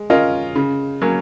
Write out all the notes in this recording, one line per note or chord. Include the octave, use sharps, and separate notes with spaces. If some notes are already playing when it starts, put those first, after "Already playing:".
Already playing: G#3
C#4 F4 A#4 D#5
C#3
F#3 A#3 C#4